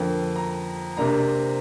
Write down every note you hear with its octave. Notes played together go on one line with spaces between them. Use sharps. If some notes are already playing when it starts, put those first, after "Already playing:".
Already playing: F2 D3 A#3 G5
A#5
C3 A#3 D4 A#5